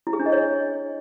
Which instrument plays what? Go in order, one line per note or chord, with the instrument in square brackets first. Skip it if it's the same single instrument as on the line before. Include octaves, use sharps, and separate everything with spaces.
[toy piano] E4
G#4
D4
D#5
C#5